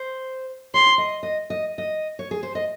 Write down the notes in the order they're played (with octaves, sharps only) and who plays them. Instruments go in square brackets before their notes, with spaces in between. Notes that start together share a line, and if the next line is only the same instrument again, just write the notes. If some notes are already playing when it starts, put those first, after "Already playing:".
Already playing: [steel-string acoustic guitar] C5
[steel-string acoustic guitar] C#5 [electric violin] C6
[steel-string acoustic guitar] D#5
D#5
D#5
D#5
C#5
G#4
C5
D#5